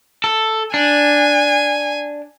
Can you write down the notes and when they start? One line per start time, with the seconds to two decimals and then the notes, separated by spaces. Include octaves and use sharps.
0.24 A4
0.74 D4 G#5